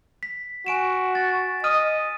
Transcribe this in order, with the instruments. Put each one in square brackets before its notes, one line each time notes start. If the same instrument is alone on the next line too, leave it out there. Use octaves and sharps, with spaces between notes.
[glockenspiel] B6
[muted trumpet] F#4 [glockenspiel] G#5 D7 E7
[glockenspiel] A6
[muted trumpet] D#5 [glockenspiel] D#6 F6 D#7